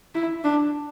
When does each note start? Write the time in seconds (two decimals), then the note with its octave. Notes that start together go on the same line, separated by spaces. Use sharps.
0.15 E4
0.44 D4